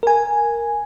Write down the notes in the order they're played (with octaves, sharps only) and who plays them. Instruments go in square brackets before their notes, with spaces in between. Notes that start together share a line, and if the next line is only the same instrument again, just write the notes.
[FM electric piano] A#4 G#5